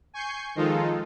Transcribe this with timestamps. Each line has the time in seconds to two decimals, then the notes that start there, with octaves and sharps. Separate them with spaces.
0.14 G#5 C#6 G6 C7
0.55 D#3 F3 G#3 D#4 F4 A4